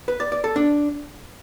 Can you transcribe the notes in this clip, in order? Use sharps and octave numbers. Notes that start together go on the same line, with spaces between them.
B4
D5
D5
A4
D4